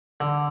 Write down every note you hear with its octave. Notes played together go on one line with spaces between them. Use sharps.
D3